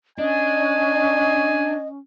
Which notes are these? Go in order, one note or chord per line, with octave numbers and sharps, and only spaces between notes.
C#4 D4 D#5 G#5